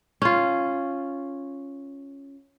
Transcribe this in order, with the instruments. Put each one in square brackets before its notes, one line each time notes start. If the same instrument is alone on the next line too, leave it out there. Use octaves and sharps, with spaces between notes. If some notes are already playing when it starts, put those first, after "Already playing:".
[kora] C#4 F4